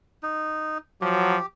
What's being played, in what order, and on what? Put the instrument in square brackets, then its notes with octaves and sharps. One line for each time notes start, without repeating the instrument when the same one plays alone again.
[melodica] D#4
[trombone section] F3 F#3 [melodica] G4